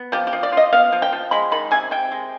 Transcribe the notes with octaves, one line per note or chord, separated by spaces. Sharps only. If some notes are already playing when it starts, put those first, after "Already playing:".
Already playing: B3
F3 G4
G4
F3
D5
F4 D#5
B3 F5
F3
G5
F3
G#3 B5
D#3 B5
C3 G#5
C3 G5
G#3